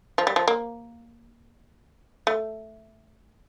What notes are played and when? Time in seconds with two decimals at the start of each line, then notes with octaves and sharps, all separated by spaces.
0.18 F3
0.27 G3
0.36 F3
0.48 A#3
2.27 A3